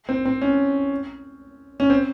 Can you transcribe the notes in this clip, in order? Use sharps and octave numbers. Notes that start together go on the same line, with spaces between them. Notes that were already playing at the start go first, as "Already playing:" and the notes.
C4
C4
C#4
C#4
C4